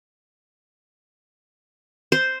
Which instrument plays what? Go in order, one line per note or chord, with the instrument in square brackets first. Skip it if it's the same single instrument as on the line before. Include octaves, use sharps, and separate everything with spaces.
[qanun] C5